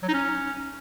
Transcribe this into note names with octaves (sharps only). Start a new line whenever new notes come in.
F#3
D#4
C#4